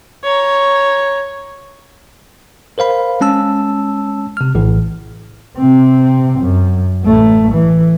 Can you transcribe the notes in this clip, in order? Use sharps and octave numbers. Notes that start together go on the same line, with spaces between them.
C#5 A#5
A#4 C5 F5 B5
G#3 C#4 A5 E6
C3 F6
A#1 A2 E3
C3 C4
F#2
A1 A3
E3